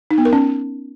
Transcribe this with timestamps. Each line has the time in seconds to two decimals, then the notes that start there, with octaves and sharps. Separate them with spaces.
0.11 D#4
0.18 B3
0.25 A#4
0.33 C#4